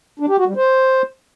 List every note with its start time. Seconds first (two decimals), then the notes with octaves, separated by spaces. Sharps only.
0.20 D4
0.29 G4
0.38 F#4
0.47 G3
0.56 C5